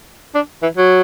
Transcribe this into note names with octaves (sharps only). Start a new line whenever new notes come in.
D4
E3
F#3